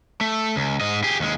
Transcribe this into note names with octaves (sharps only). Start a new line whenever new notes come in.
A3
C#2
G#2 D#5
G4 G#4
D#2 G#3